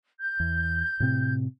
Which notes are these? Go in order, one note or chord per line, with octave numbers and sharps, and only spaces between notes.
G6
E2
A2 C3 C4